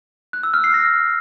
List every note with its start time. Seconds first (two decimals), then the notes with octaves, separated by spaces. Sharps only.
0.33 F#6
0.43 E6
0.54 F6
0.64 C7
0.74 A#6